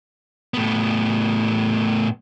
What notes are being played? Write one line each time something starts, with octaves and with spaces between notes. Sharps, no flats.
A2 B3